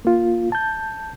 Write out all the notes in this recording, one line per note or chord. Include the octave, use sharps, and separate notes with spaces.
A#3 F4
A5 G6